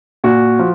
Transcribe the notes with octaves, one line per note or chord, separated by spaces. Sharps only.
A#2 F#4
F3